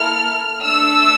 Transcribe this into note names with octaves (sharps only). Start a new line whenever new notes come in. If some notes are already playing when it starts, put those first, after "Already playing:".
Already playing: A#3 E4 A4 F6
A3 D4 A4 E6